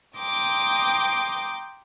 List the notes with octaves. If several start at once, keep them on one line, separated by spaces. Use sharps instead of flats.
G5 A#5 C6 D6 D#6